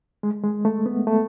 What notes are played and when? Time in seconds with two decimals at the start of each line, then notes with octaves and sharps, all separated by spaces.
0.23 G#3
0.44 G#3
0.65 A3
0.86 B3
1.07 A3